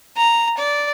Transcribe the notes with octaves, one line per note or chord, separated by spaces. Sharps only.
A#5
D5